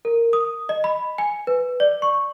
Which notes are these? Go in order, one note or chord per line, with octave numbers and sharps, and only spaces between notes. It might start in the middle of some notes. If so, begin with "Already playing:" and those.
A#4
D#6
D#5
B5
G#5
B4
D5
C#6